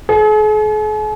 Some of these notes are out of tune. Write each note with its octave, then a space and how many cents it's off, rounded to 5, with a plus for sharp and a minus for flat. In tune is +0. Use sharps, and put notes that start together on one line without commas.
G#4 +45